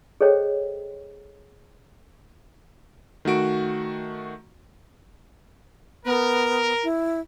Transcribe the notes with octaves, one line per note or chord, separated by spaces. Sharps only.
G#4 A4 C5 C#5 D#5 G5
D#3 A3 F#4 D7
B3 A#4
E4